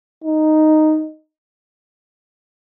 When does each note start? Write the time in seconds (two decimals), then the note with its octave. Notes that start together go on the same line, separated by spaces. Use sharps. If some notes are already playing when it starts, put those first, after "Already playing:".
0.24 D#4